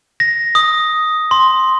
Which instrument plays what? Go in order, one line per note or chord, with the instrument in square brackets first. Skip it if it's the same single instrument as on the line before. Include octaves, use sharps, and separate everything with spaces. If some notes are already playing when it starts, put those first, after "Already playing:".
[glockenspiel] A#6
D#6
C6